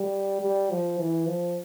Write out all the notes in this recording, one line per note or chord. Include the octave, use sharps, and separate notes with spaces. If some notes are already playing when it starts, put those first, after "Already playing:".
Already playing: G3
G3
F3
E3
F3